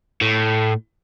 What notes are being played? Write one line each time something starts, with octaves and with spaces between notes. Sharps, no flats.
A2